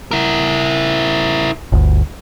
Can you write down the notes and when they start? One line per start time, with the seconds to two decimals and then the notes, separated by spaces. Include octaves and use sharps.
0.11 E4 A#4
1.72 G1 D2